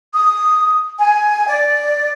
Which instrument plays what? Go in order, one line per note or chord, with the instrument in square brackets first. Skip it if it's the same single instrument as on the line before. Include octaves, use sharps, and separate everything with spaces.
[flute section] D#6
G#5
D5